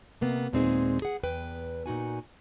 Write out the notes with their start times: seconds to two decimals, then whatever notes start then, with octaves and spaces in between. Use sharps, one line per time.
0.21 C3 A#3 B3
0.53 D#2 A#2 G#3 C4 D#4 G#4
1.02 G#4 F#5
1.23 E2 B4 G5
1.86 A#2 D#4 F#4 G#5